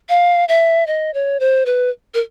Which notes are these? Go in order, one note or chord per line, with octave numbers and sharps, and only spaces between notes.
F5
E5
D#5
C#5
C5
B4
A#4